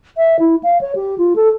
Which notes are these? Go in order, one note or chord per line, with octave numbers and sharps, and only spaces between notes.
E5
E4
F5
C#5
G4
F4
A4